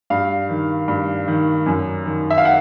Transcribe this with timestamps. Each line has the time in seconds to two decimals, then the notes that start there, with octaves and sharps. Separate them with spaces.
0.10 G2 F5
0.49 D#3
0.88 G2
1.28 D#3
1.66 F#2
2.05 D#3
2.30 E5
2.38 F5
2.45 F#5